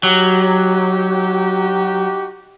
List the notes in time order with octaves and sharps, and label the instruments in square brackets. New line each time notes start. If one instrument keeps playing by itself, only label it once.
[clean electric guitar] F#3 [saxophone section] D#4 F#4 G4